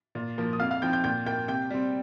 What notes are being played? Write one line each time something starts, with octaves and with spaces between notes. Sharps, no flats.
A#2
F3 A#3
D#6
F2 F5 F6
F5 F6
F3 C4 G5 G6
G5 G6
A#2 G5 G6
A#3 G5 G6
C3 G5 G6
G3 C4